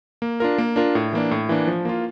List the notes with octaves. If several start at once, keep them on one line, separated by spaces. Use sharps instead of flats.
A#3
D4 F4 A#4
A#3
D4 F4 A#4
A2
E3 A#3 D4
A2
E3 A#3 D4
F3
A#3 F4